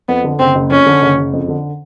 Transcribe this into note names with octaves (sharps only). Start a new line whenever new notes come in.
F2 B3
D3
F#1 C4
F#1
F2 C#4
D3
F#1
F#1
F2
D3